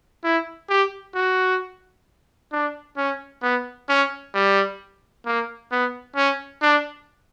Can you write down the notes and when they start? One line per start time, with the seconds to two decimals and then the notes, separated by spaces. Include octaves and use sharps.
0.24 E4
0.69 G4
1.15 F#4
2.52 D4
2.97 C#4
3.42 B3
3.89 C#4
4.34 G3
5.26 A#3
5.72 B3
6.16 C#4
6.62 D4